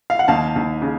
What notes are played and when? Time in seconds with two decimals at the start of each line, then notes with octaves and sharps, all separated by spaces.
0.10 F5
0.19 F#5
0.28 D#2 F5 A5
0.56 D#2
0.82 C#3